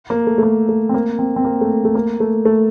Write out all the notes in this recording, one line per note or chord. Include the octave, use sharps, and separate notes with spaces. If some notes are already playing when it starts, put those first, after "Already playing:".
A#3
A3
A3
A#3
A3
C4
A#3
C4
C4
A#3
A3
A3
A#3
A3
A3